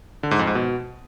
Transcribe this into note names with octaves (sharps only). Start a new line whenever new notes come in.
D3
G#2
F2
G#2
B2